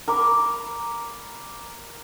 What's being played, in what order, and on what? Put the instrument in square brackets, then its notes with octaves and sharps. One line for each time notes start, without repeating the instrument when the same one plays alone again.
[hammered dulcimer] A#4 B5 D6